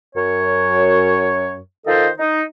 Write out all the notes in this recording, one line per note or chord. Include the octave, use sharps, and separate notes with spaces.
F#2 C#5
D#3 F4 A4 C5 D#5
D#4